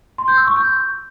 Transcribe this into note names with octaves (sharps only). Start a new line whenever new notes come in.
C6
G6
E6
C#6
G6